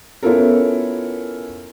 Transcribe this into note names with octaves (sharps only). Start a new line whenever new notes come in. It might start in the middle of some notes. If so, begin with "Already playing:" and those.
B3 C#4 E4 F4 A4 A#4